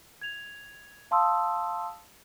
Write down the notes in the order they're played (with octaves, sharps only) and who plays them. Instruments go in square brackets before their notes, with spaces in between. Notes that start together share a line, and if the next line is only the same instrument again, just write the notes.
[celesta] G#6 F7
F5 A5 C6 D#6 E6